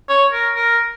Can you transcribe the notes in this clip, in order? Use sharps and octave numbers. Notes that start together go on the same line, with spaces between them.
C#5
A#4
A#4